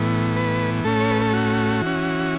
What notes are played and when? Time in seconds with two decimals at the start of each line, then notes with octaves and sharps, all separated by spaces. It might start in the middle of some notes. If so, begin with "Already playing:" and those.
Already playing: A2 E3 B3
0.36 B4
0.85 A2 A3 C#4 A4
1.00 C#5
1.11 B4
1.22 A4
1.33 F#4
1.82 E3 C#4